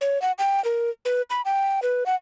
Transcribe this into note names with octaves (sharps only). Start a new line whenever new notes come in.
C#5
F#5
G5
A#4
B4
B5
G5
B4
F#5